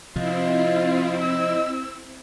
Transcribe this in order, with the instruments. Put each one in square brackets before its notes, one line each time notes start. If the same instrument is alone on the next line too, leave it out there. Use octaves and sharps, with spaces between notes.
[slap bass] C3 F3 [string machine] C4 E4 [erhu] F4 [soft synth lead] D#5
[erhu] E6